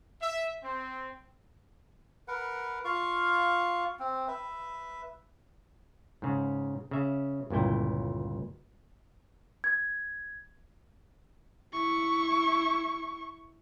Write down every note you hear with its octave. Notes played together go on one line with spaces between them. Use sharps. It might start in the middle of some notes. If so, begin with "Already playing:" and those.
E5
C4
A#4 B4 F#5
F4 F5 C#6
C4
B4 E5
G#2 C#3
C#3 E5
G1 C#2 A#2 E4 G5
G#6
E4 C#6